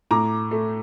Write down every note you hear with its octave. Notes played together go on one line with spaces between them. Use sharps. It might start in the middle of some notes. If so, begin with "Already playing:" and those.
A2 A#5 D6
A3